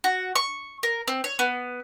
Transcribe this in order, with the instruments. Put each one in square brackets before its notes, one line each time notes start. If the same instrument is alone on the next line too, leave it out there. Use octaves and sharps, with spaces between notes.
[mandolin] F#4
C#6
A#4
C4
C#5
B3